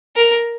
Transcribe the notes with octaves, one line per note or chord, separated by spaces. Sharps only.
A#4